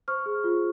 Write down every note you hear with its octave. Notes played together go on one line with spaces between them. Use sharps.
C5 C#6 F6
G#4
F4